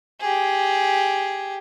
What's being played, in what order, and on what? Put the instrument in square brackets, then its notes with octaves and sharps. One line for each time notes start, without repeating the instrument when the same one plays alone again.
[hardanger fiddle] G4 G#4